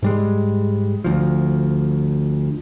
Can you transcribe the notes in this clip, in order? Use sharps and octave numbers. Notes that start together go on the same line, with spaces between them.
G#2 G3 G#3
D2 F3